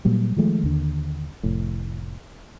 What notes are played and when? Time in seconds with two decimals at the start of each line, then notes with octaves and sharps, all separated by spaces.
0.05 A#2 F#3 G3
0.36 D#3 F3 G#3 A3
0.64 D#2 D3
1.43 F1 A2